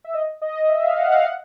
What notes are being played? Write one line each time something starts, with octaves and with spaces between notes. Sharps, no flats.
E5
D#5
D#5
E5
F5
F#5
F5
F#5